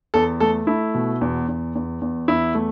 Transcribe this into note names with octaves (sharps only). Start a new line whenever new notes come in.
E2 A4
A3 A4
A3 E4
B2
E2
E2
E2
E2
E2 E4
A3